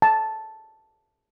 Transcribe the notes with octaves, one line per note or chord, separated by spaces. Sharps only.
A5